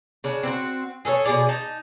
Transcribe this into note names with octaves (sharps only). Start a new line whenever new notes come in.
C#3 D4
C4 E4 F#4
G#4 A4 B4 C#5
B2 G#4 D5
D#4 A5